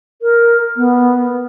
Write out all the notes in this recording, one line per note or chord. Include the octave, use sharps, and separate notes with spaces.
A#4
B3